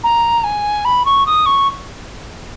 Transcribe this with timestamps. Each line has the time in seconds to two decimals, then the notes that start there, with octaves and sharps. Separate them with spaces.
0.04 A#5
0.44 G#5
0.85 B5
1.05 C#6
1.26 D#6
1.46 C#6